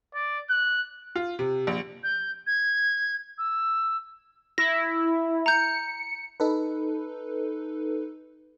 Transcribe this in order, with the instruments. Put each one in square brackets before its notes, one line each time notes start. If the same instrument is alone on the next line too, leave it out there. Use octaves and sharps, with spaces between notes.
[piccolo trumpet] D5
F#6
[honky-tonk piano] F4
C3
A#1
[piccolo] G6
G#6
E6
[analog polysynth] E4 [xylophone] A#6
[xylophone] A#5 G6 [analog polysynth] C#7
[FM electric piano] D#4 A4 B4